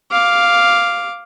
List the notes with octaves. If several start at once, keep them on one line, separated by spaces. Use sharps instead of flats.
F5 D6